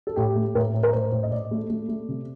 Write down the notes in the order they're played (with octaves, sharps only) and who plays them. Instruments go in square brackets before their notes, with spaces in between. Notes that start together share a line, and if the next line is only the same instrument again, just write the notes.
[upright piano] A4
A2 G4
A3
A2 A#4
A2
A#4
A2 C5
A2
D#5
A2 D5
A3
A3
A3
C3